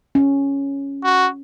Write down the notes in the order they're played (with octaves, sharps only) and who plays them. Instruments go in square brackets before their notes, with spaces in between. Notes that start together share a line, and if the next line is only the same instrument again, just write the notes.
[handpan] C#4
[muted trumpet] F#4